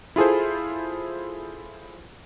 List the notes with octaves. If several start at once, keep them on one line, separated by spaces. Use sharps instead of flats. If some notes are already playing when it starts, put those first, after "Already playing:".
E4 F4 G#4 A4 C5